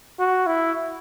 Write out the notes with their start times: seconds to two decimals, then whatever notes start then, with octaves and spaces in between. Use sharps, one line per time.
0.19 F#4
0.47 E4